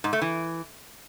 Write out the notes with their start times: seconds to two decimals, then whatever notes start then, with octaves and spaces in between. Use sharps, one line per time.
0.04 G#2
0.13 A3
0.21 E3